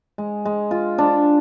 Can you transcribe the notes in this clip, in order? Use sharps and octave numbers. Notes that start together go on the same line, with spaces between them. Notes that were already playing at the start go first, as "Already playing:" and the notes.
G#3
G#3
F4
D4